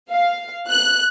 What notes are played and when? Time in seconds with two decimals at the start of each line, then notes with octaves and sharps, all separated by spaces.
0.12 F5
0.69 F#6